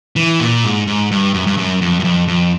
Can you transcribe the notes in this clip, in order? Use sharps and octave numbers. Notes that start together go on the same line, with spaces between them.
E3
A#2
G#2
G#2
G2
F#2
G2
F#2
F2
F#2
F2
F2